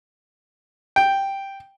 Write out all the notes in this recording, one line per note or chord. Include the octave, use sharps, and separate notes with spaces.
G5